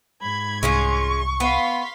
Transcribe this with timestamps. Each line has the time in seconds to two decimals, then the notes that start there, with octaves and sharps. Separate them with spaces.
0.22 G#2 B5 G#6
0.63 C2 G#3 C#4 F4 C#6
1.40 B3 F5 C6 B6